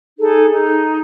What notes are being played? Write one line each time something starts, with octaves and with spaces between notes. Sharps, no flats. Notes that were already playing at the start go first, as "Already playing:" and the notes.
D#4 G#4 A4
D#4